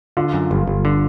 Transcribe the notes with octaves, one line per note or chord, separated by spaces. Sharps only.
D3 F4
F#2
G1
G1
D3